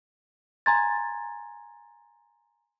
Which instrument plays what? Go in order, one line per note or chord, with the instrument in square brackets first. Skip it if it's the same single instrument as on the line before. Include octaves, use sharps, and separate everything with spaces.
[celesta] G#5 A#5 C6 G#6 A6